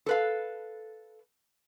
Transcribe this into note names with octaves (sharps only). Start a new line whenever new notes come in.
A4 B4 F5